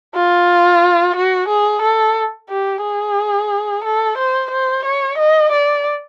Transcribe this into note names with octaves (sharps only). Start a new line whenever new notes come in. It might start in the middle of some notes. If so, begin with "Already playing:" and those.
F4
F#4
G#4
A4
G4
G#4
A4
C5
C5
C#5
D#5
D5